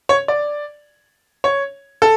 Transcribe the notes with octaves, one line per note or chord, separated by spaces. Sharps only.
C#5
D5
C#5
A4